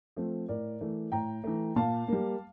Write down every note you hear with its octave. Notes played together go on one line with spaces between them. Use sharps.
F3 A3 C4
A2 A#4 D5
E3 A3
A2 G5 A#5
E3 A3
A#2 F5 A5
G3 A#3